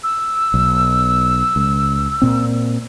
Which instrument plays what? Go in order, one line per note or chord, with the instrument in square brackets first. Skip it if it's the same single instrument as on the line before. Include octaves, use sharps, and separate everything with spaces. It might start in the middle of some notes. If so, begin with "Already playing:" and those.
[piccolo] E6
[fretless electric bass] B1
C#2
A#2 C4